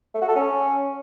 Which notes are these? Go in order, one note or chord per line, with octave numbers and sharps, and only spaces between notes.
A3
F#4
A4
C#4